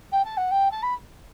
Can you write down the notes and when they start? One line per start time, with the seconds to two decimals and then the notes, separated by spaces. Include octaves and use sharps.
0.12 G5
0.24 A5
0.37 F#5
0.51 G5
0.71 A5
0.82 B5